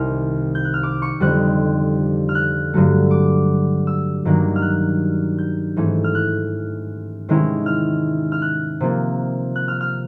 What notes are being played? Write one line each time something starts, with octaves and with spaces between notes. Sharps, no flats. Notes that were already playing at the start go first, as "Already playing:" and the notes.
Already playing: C2 C3 D#3 F6
G6
F#6
F6
D6
C#6
F2 D3 G3 C4 D#4 F#6
F6
F#6
G2 D3 F#3 A3
D6
E6
G2 D#3 F#3 A#3 D4
F6
F#6
G6
G#2 E3 A3 C#4
F6
F#6
C3 D#3 G#3 C#4 E4
F6
F6
F#6
C3 F3 A#3
F#6
F6
F6